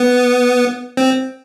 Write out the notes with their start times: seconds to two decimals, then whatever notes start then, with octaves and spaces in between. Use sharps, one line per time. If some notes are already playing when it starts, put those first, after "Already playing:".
Already playing: B3
0.97 C4